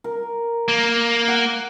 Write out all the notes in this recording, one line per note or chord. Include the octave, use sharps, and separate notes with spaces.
A#4
A#3
F#5